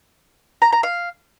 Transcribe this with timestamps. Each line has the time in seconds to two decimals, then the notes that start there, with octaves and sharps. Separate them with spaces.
0.62 A#5
0.72 A#5
0.83 F5